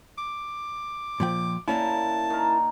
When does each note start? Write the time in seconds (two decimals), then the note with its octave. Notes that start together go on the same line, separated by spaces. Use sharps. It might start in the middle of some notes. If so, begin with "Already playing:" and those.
0.18 D6
1.20 A#2 F3 G5
1.68 A#2 A#3 C#4 E4 A5
2.30 D#3 A#4